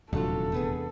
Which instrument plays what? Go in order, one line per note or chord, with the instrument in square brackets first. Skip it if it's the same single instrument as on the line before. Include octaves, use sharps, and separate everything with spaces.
[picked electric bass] D#1 [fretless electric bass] E2 C3 D4 [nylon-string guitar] F#3 A3 F4 [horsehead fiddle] A4
[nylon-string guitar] A3 B3 G#4